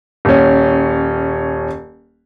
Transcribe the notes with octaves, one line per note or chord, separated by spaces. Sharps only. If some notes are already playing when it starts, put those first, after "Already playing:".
D#1 C#4